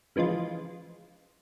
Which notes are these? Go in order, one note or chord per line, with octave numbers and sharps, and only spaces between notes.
C#3 E3 F3 G#3 F4